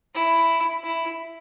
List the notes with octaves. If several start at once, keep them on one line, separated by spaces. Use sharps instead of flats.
E4
E4